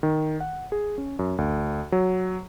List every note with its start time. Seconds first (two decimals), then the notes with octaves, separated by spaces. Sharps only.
0.03 D#3
0.40 F#5
0.72 G#4
0.98 C#4
1.19 F#2
1.38 D2
1.92 F#3